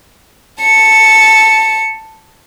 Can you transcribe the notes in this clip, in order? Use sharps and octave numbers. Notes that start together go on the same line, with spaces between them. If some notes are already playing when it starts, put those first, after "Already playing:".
A5 C#7